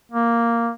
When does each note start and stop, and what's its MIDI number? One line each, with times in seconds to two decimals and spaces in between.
0.12 0.70 58